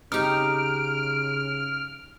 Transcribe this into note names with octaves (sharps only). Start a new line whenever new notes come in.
C#3 D#4 G4 F6 D7